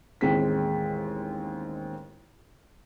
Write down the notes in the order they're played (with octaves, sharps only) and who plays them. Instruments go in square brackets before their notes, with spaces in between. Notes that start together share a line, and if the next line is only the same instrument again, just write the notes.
[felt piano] A1 D#2 G#3 C4 B6